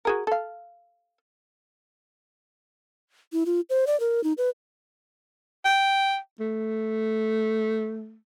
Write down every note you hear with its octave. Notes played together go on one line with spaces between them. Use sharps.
F#4 G#4 A#4
A4 F5
E4
F4
C5
D5
A#4
D#4
B4
G5
A3